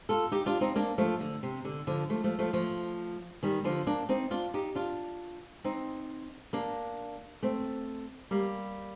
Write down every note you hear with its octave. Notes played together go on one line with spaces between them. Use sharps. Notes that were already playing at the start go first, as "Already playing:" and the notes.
F4 A4
D#4 G4
D4 F4
C4 D#4
A#3 D4
F3 A3
D3
C3
D3
D3 F3
F3 A3
F3 A3
F3 A3
F3 A3
D#3 G3
D3 F3
A#3 D4
C4 D#4
D4 F4
D#4 G4
D4 F4
C4 D#4
A#3 D4
A3 C4
G3 A#3